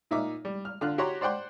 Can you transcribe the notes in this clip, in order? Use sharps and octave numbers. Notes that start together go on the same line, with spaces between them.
A#2 D#4 E5 D6
G3
F6
D3 F4 F6 F#6
F#4 G4 C#5 F#5 A#5 C6
C5 D5 F#5 G5 C6